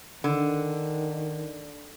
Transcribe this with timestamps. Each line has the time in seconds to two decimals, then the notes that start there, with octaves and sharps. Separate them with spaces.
0.24 D3 D#3